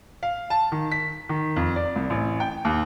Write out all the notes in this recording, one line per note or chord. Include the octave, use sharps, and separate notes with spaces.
F5
A5
D#3
B6
D#3
F2
D5
C2
A1
G5
D#2